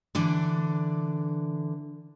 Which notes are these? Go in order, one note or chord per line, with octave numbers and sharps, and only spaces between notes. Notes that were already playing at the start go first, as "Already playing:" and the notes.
D3 E3 D4